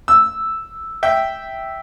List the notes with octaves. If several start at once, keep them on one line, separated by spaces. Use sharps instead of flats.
E6
E5 G5